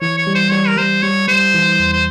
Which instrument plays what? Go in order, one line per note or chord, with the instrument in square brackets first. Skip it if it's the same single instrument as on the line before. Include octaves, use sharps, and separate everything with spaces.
[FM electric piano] E3 [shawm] C#5
[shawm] C#5
[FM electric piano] G3
[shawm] C5
[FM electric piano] G3 [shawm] C#5
[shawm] A#4
[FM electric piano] G3 [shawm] C5
[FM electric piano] G3 [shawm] C#5
[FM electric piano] G3 [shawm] C5
[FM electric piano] E3
E2
[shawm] C5